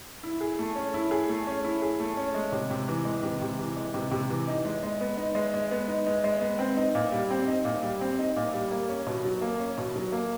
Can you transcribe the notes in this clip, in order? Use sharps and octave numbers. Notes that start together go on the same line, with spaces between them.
E4
G#4
A3
C#4
E4
G#4
A3
C#4
E4
G#4
A3
C#4
G#3
C3
C3
E3
G#3
C3
C3
E3
G#3
C3
C3
E3
D#4
G#3
G#3
B3
D#4
G#3
G#3
B3
D#4
G#3
G#3
B3
C4
D#4
A#2
G3
C4
D#4
A#2
G3
C4
D#4
A#2
G3
A#3
C#4
B2
F#3
A#3
C#4
B2
F#3
A#3